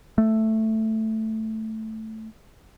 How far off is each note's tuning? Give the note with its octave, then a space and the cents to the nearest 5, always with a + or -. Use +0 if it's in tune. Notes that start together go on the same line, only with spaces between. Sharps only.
A3 +0